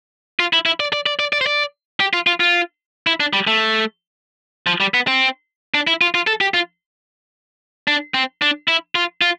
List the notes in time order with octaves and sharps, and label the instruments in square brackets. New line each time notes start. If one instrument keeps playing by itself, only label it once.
[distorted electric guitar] F4
E4
E4
D5
D5
D5
D5
D5
C5
D5
G4
F4
F4
F4
E4
D4
G3
A3
F3
G3
B3
C4
D4
E4
F4
F4
A4
G4
F4
D4
C4
D4
E4
F4
F4